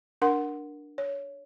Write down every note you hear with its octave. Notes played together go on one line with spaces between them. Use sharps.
D4 A#4 F#5 C6
C#5